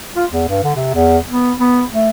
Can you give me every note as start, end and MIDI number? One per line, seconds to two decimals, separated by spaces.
0.16 0.25 65
0.30 0.48 40
0.48 0.61 43
0.64 0.72 50
0.76 0.91 48
0.94 1.18 40
1.29 1.52 59
1.58 1.82 59
1.93 2.10 57